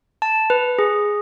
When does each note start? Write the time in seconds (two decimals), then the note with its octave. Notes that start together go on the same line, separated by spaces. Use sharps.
0.22 A5
0.50 B4
0.79 G#4